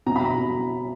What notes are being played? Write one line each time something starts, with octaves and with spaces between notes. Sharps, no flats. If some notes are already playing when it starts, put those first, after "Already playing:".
B2 A#5
B5
A#5
B2